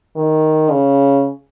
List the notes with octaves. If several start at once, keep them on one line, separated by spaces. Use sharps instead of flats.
D#3
C#3